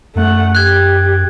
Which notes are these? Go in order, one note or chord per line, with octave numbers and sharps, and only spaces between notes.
F#2 A3 F#5
G4 F#6 G#6